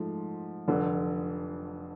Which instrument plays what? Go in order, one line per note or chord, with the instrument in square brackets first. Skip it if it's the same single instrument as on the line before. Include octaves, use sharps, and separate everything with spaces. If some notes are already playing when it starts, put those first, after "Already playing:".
Already playing: [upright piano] G#2 F3 A3
F1 F2 D3